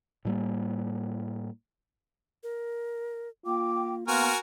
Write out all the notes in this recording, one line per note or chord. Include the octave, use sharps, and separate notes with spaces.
A2 G3 A#3
A#4
A#3 F4 G5 D6
B3 F#4 A#4 F5 G#5 C6 F6